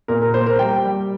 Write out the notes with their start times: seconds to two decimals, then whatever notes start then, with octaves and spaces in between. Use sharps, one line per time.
0.08 A#2 A#4
0.22 A#4
0.34 A#3 C5
0.46 A#4
0.59 G3 G5
0.85 G3